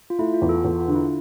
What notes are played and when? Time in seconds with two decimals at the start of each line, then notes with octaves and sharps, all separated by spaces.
0.10 F4
0.19 A3 E4
0.34 F4
0.42 E2
0.49 F4 A4
0.64 E2 F4 A4
0.80 F4
0.88 D3
0.95 E4